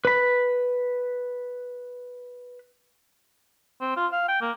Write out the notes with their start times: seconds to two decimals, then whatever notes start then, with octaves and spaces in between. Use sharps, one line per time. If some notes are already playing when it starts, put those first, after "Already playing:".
0.05 B4 B5
3.81 C4
3.96 F4
4.12 F5
4.28 G5
4.41 A#3